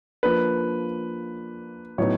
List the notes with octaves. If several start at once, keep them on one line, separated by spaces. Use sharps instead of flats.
F3 A#3 D4 B4
A2 F#3 B3 D#4 C#5